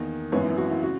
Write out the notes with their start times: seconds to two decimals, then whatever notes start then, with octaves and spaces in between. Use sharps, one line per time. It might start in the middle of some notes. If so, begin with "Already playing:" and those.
Already playing: E2 D#3 A#3
0.32 G#1 F#2 E3 B3 C#5
0.45 E4
0.57 F#4
0.70 E4
0.83 C#3 F#4